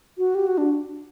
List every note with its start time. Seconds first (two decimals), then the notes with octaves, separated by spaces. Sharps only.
0.18 F#4
0.35 G4
0.47 F#4
0.58 D4